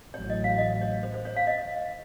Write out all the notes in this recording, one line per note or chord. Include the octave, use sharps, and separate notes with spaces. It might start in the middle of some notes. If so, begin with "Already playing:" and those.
A1 A2 F#3 C#5
D#5
F5
D#5
C#5
C5
C5
C#5
F5
D#5